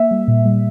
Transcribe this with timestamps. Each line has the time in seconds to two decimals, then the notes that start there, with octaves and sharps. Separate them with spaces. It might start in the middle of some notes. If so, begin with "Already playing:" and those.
Already playing: A#3 E5
0.11 G3
0.28 A#2
0.46 G3